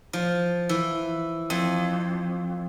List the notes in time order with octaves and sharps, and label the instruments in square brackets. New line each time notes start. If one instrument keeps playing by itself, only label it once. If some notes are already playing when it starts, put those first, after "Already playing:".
[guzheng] F3
E3
F2